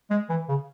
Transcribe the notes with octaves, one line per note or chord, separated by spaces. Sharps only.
G#3
E3
C#3